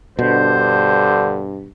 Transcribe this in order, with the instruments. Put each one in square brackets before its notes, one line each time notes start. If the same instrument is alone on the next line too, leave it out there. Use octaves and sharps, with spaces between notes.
[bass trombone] G2 [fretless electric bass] B2 [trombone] D3 [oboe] C5